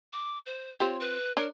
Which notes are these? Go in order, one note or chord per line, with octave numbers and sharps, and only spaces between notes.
D6
C5
C4 F4 G4 C#5
B4
D4 A#4 C#5 A#5